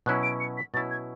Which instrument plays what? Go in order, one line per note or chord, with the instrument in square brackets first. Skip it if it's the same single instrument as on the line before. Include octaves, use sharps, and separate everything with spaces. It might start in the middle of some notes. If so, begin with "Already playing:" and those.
[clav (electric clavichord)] B2 F#3 C#4 E4 [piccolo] F#6
[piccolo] D7
C#7
B6
[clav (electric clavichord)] B2 F#3 C#4 E4 [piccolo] A6
[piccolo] G#6